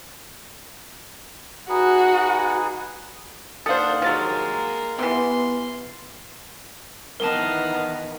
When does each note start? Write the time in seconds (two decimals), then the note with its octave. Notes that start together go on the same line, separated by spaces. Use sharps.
1.69 D#4 F#4 G#4 B4
3.66 D#2 D4 A4 C5 F5 F#5 D#6
4.02 F3 F#3 G#3 A#3 F6 A6
4.99 C3 E3 B3 C6
7.20 D#3 E3 B3 A#4 D#5 F5 A5